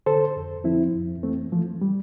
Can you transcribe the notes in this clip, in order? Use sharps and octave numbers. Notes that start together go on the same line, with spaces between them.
D3 A4 C5
F2
F3 C4 E4
F2
E3 A3 C4
E3 F3 A3
G3